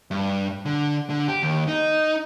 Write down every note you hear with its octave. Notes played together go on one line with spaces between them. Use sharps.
G2
D3
D3
G4
D#2
D#4